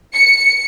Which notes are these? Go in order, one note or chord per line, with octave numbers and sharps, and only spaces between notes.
C#7